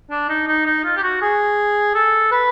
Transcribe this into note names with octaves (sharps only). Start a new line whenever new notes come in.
D4
D#4
D#4
D#4
F4
G4
F#4
G#4
A4
B4